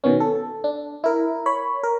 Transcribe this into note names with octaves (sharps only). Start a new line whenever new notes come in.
B2 D#3 B3 C#4
A4
D4
E4 A#4
C#5 B5
A#4